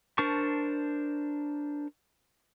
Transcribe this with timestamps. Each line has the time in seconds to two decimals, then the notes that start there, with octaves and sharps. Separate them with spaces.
0.18 D4 A#4 C5 A5 C#6